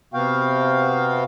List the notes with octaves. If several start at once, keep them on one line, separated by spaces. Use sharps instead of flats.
C3 B3 F#4 F5 G5